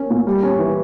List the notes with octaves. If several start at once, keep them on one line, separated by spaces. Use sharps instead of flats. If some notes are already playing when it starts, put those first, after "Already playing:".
Already playing: A#3 C#4
A#2
G3
C#4
E3